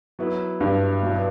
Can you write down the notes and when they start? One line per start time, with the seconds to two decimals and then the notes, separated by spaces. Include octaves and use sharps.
0.19 F#3 B3 E4 B4
0.61 G2
1.02 B2 F#3 B3 E4